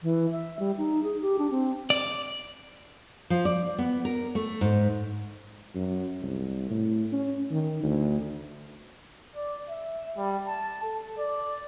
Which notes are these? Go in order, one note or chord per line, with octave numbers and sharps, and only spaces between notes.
E3
E5
G3
D#4
G#4
G4
D4
C4
D5
F3
D5
B3
A#4
A3
G#2
F#2
C2
A2
C#4
D#3
D2
D5
E5
G3
A5
A4
D5